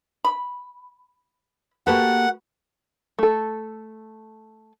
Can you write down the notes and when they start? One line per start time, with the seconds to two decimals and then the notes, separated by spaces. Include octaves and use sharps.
0.25 B5
1.87 A#3 F#4 G4 A4 B4 F#5
3.19 A3 A4